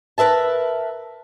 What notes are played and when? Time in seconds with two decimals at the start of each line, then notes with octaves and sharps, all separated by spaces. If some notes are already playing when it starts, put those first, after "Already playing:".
0.18 A#4 B4 E5 A5